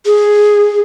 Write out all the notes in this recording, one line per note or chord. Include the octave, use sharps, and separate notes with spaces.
G#4